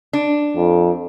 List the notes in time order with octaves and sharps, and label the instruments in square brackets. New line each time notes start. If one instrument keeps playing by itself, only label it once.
[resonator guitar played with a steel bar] D4
[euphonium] F2